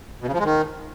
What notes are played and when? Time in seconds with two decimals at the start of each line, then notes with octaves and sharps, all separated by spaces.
0.22 B2
0.27 C#3
0.33 F3
0.39 G#3
0.45 D#3